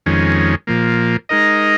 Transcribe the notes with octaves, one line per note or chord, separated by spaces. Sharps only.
F2 D#3 G#3 C#4
A#2 F3 A#3
G#3 D#4 A#4 D#5